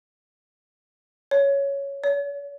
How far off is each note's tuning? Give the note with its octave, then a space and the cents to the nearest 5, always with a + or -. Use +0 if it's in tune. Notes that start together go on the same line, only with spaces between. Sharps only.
C#5 +5
C#5 +40